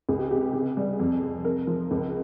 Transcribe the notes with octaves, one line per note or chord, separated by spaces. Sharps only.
C#2 G#4
G4
C3 G4
C3 G#4
G3
F2
C3
C3 A#4
F3
C#2